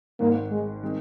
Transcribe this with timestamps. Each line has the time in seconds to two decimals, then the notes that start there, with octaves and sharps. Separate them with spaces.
0.20 G#1 G#2 D#3 A#3
0.51 G#3
0.83 D#3 G#3 C4